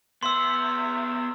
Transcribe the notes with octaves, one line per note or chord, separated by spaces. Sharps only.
B3 E5 C6 E6